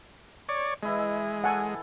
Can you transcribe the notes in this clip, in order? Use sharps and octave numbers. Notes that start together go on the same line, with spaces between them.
C#5 D5
E3 G#3 E4 D#5
A4 F#5 G#5